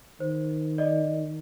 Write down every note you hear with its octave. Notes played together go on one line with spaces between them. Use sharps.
D#3 C5
D5 D#5